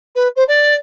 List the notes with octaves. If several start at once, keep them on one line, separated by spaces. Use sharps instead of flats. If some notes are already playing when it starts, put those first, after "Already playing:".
B4
C5
D5